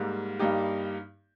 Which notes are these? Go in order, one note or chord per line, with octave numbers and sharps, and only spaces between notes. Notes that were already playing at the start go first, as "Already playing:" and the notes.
Already playing: G#2 G3 A#3
G2 G3 A#3 D#4 G4